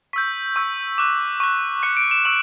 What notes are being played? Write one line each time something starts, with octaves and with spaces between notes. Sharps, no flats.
C#6 E6 G6 B6
C#6 E6 G6
D6 F#6
C#6 F#6
C#6 F#6 C#7
D7
E7
C#6 E6 F#7